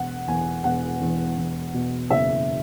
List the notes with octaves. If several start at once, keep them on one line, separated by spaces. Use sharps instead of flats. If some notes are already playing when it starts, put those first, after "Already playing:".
Already playing: E1 F#5
E2 G#5
E1 F#5
E2
E2
B2
F#1 E5